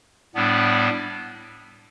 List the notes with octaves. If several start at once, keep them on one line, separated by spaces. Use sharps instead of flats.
A2 G3 B3 D4